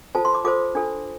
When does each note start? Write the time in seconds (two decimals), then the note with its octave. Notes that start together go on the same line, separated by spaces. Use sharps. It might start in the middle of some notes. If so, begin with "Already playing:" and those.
0.15 F4 A4 C5 A5
0.25 C6
0.35 D6
0.45 F4 A4 C5 D6
0.75 D4 F4 A4